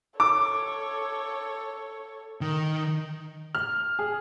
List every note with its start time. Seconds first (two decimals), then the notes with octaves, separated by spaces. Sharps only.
0.20 A4 C#5 D6
2.41 D#3
3.55 F6
3.99 G#4